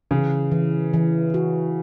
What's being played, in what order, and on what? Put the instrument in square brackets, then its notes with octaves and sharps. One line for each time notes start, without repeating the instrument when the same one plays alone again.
[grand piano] C#3 [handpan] E3
[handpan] E3
E3
F#4